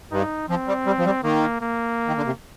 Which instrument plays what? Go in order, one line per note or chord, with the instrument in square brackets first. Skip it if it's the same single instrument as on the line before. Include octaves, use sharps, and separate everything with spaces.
[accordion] G2 [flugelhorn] D#4
[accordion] F3 [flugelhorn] C4
[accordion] G3
G3
F3
G3
[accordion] D#3 [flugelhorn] A#3
[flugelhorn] A#3
[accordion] D#3
D3
C3